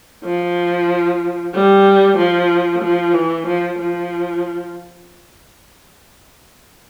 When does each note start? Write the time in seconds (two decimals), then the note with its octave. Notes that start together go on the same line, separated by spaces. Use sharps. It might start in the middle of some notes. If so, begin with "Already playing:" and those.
0.25 F3
1.54 G3
2.18 F3
2.82 F3
3.14 E3
3.47 F3
3.78 F3